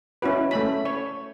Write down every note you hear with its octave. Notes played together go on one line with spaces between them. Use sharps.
C#4 E4 F#4 B4
A3 C#4 B5
C#5